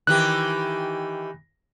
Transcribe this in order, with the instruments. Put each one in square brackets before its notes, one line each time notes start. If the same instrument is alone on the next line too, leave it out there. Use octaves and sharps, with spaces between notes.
[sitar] D#3 E3 G4 [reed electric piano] F#6